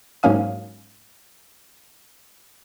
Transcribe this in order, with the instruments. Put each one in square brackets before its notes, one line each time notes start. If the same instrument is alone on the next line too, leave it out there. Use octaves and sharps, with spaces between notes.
[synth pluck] G#2 F#3 A#3 C#4 F5 D#6